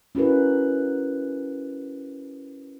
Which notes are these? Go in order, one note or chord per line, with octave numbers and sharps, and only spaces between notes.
C#4 E4 F#4 A#4 B4